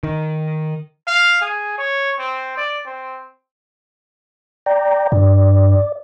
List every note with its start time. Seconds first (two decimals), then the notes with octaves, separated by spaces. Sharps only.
0.03 D#3
1.07 F5
1.41 G#4
1.78 C#5
2.19 C4
2.57 D5
2.86 C4
4.66 D5 G5 A#5
5.12 G2 D5